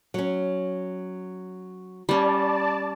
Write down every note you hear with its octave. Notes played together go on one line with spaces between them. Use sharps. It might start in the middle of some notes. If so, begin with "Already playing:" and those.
F#3 C#4
G3 C#4 D5 A5